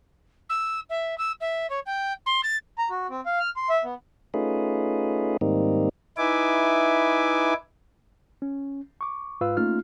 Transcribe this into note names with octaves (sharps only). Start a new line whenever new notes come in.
E6
E5
E6
E5
C#5
G5
C6
A6
A#5
F#4
C4
F5
F6
C6
E5
B3
A3 C#4 D#4 F4 G#4 B4
G#2 D#3 G3 A#3 C4 D#4
D#4 E4 B4 E5 G#5 D6
C#4
C#6 D6
G#2 F4 B4 F5 E6
A3 A#3 C#4 D#4 F4 F6